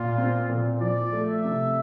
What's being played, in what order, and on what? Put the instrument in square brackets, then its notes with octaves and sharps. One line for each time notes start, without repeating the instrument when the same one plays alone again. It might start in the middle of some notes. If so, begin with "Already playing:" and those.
Already playing: [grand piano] A#2 [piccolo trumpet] F4
[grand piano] C4
A#2
[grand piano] F3 [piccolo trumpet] D5
[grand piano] A3
[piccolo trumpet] E5
[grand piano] C3